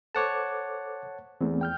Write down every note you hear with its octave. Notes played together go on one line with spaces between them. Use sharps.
A4 C5 C#5 F#5 A5 D6
E2 A3 C4
G5 F6 G6